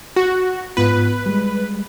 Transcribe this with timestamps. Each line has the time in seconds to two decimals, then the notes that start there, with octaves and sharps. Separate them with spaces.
0.16 F#4
0.77 G#2 B3 F4 B4
1.26 G3 G#3